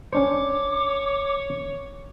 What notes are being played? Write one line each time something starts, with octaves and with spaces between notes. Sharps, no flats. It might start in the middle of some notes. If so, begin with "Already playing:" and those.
C#4 D4 C5 C#5 D6